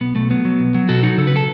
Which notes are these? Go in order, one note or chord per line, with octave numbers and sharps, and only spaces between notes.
B1 B3
B1 A3
F#3 B3
F#3
B1
F#3
B2 F#4 A4
F#3 D#4 F#4
C#3 A4
B4
F#4 A4